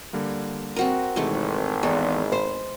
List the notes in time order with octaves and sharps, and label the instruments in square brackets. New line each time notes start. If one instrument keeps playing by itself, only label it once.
[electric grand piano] D3 G3 A#3
[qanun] C4 F#4 A#4
[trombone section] G#1 [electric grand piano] C3 E3 [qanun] G#3 A3
[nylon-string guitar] E2 [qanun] G#3 [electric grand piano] A4 C#6
[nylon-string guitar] C5 [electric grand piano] B5